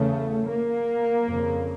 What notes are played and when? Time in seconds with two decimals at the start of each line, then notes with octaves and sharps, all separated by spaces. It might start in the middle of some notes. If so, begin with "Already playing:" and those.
Already playing: E2 C#3 A3
0.49 A#3
1.26 F2 C#3